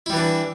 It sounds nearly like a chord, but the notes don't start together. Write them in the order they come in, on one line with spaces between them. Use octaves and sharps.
E4 G3 E3 D4